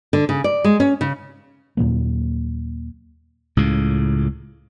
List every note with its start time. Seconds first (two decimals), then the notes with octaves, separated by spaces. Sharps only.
0.13 D3
0.29 C#3
0.44 D5
0.64 G#3
0.80 C#4
1.01 C#3
1.77 D#2 A#2 F#3 A#3
3.57 C#2 A2 C#3